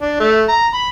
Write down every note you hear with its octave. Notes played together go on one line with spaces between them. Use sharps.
D4
A3
A#5
B5